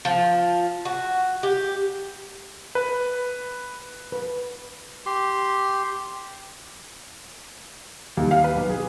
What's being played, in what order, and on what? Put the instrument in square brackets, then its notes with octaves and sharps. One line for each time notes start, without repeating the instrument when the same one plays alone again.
[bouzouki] F3
F#4
G4
[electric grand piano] B4
[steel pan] B4
[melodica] G4 C6
[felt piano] D#2
F5
B4
B1
G#4